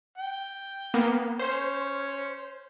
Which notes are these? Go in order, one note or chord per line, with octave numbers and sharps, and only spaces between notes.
G5
A#3 B3
C#4 C5